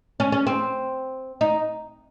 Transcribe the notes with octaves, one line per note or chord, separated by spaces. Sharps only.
C#4
C#4
C4
D#4